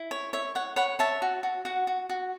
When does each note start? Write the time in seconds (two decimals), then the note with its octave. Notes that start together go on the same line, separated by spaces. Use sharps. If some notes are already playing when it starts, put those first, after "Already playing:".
Already playing: E4
0.11 C#5
0.33 C#5 E5
0.55 C#5 F#5
0.76 C#5 F#5 B5
0.99 C#5 E5 A5
1.22 F#4
1.43 F#4
1.65 F#4 F#5
1.87 F#4
2.09 F#4